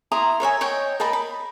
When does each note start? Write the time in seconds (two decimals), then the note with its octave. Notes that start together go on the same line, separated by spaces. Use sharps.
0.12 E4 A#5 C6 D#6
0.40 A#4 C#5 E5 G#5
0.61 C#5 D#5 G5
1.00 A#4 D#5 A5 B5
1.13 B5